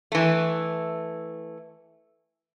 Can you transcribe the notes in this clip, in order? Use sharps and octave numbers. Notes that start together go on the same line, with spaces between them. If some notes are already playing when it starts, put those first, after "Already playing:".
E3 A3